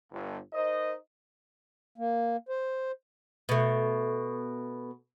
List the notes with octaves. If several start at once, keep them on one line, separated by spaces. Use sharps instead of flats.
G1
D#4 A#4 C5 D#5
A#3
C5
B2 A3